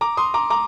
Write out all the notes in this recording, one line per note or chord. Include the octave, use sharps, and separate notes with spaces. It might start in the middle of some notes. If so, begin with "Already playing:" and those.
A#5 D6
C6 D#6
A#5 D6
A#5 D6